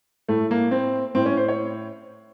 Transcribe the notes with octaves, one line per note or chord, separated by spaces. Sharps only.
A2 A3
A#3
C4
A2 C4
C#4
C5
C#5